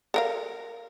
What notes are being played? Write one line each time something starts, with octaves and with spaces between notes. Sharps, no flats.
A4 A#4 F5